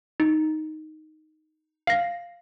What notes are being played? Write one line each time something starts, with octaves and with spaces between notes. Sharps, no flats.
D#4
F5 A#6